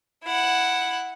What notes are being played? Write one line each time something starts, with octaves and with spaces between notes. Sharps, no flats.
E4 F#5